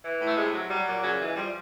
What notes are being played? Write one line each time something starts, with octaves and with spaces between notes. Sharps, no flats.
E3
A2
A3
C3 G#3
F#3
F#3 G3
A#2
C#3 F#3
E3
G#3
F3 G3